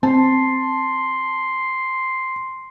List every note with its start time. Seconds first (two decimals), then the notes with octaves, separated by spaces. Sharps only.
0.03 C4 A5 C6